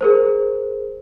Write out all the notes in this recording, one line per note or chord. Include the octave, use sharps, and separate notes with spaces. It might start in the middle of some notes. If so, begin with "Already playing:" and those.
G#4 A#4 C5